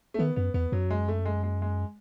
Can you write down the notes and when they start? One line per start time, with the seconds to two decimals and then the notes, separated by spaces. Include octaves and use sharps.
0.14 A3
0.19 D#3 B3
0.36 F#2 B3
0.54 E2 B3
0.72 F#2 F#3
0.90 G#3
1.08 A3
1.25 G#3
1.43 G#3
1.62 G#3